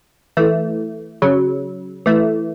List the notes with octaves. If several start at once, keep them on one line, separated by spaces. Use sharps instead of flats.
E3 A3
C#3 F#3
E3 A3